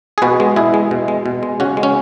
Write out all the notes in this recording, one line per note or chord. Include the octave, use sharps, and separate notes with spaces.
G#4
B2 F#4 B4
G#3
B2 E4 G#4
G#3
B2
G#3
B2
G#3
C#3 C#4 F#4
G#3
C#4